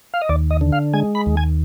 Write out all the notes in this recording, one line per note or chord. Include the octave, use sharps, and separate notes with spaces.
F5
D#5
D#2 D5
D#5
D3
F5
G#3 G#5
B5
D#2
G#5